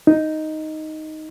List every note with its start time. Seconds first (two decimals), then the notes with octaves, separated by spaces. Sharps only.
0.07 D#4